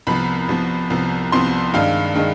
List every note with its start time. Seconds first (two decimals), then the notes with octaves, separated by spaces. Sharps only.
0.07 C2 C3 F3 B3 B5
0.49 C2 C3 F3 B3
0.90 C2 C3 F3 B3
1.32 C2 C3 F3 B3 C6
1.74 G2 D#3 G#3 D4 F5
2.15 D#3 G#3 D4